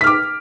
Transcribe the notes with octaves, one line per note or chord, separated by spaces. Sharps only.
D6 F6 B6